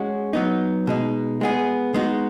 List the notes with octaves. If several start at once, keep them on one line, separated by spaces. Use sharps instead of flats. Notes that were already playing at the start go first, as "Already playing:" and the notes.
Already playing: G#3 C#4 F#4
F#3 B3 D#4
B2 G#3 D#4
G#3 B3 G#4
G#3 B3 D#4 F#4